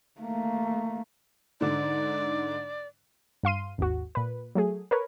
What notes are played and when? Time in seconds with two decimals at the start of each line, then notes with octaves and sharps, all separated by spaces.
0.21 A3 A#3
1.61 G#2 D3 D5
3.43 G2 F5 C6 D#7
3.78 G#1 D#2 F#4
4.15 A#2 B4
4.55 F#3 A3 G#4
4.91 A#4 B4 C#5